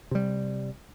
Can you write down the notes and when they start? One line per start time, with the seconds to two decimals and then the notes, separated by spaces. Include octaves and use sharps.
0.11 C3 G3